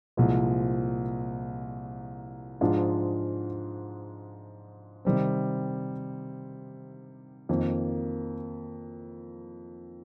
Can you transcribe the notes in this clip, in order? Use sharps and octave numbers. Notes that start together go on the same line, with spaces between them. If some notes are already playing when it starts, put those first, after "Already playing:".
C2 A#2 F3 G#3
G#2 F3 G#3 D4 F4
C3 D#3 G3 C4
F2 D#3 A#3